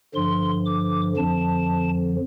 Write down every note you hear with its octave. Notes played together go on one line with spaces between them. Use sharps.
G2 D3 F3 C6
D6
F2 D3 F3 A5